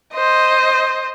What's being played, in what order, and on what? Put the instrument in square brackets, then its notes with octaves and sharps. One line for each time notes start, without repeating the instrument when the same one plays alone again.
[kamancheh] C5 D#5